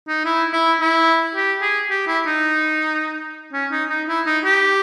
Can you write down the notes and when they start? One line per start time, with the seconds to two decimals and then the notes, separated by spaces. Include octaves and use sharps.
0.08 D#4
0.25 E4
0.53 E4
0.81 E4
1.35 G4
1.62 G#4
1.90 G4
2.07 E4
2.26 D#4
3.53 C#4
3.72 D#4
3.90 D#4
4.08 E4
4.26 D#4
4.44 G4